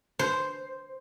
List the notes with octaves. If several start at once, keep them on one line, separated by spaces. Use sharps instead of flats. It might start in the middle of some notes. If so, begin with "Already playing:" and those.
C5